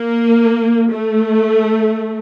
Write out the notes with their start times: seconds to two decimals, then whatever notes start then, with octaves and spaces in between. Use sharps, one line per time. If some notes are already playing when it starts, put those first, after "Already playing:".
Already playing: A#3
0.92 A3